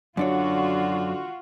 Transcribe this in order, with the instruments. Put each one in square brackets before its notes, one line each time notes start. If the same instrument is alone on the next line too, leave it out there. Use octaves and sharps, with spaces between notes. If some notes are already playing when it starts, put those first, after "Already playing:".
[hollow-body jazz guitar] F#2 D4 C#5 [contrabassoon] D3 [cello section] F4 F#4